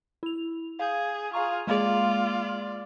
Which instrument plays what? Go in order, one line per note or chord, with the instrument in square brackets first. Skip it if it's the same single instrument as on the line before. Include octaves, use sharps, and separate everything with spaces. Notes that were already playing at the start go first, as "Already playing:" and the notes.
[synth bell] E4 F7
[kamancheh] G#4 [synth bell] F5 G6
[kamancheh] F4 G#4 [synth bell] F5 A#5 C#6
[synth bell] G#3 A#3 G#4 [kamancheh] F4 D5